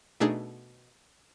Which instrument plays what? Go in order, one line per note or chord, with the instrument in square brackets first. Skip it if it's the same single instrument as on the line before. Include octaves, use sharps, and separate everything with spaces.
[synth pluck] B2 A3 D4 D#4 G#4